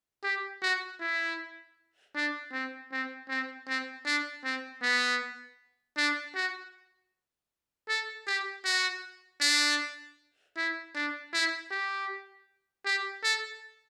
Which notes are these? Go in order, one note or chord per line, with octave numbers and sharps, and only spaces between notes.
G4
F#4
E4
D4
C4
C4
C4
C4
D4
C4
B3
D4
F#4
A4
G4
F#4
D4
E4
D4
E4
G4
G4
A4